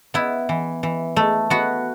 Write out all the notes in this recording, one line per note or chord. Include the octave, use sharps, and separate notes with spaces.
B3 E4
E3
E3
A3
B3 F#4